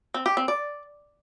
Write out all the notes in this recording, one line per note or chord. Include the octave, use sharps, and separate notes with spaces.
C4
G4
C4
D5